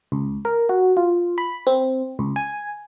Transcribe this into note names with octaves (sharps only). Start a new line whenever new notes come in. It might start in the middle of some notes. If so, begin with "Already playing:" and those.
C#2
A#4
F#4
F4
B5
C4
C#2
G#5